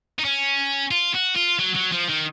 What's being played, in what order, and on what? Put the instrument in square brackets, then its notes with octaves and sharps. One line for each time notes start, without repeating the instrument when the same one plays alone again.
[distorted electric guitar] D#4
C#4
F4
F#4
F4
F#3
F#3
F3
D#3